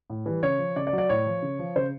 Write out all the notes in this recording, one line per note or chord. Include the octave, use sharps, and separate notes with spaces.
A2
E3 G3
C#3 C#5
F3
C#3 D5
D5
F#3
D5
A2 C#5
F3
C#3
F3
C#3 C5